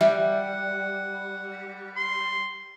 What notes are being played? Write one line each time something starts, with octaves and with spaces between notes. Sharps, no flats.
G3 E5 F#5
C6